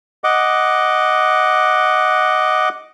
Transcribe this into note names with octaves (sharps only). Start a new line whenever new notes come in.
D#5 F#5 D6